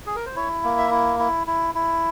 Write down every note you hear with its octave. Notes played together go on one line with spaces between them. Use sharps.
G#4
A#4
C5
E4 C#5
A#3
E5
E4
E4
E4
E4